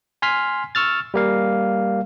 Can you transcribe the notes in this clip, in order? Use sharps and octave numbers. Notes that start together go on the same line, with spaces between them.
G#5 C6 F6 B6
C#6 E6 F6 A6
G3 A#3 F5